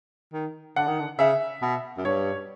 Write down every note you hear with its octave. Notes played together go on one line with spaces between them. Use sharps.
D#3
D3 F#5
D#3
D3
C#3 E5
B2
F#2
G2 C#5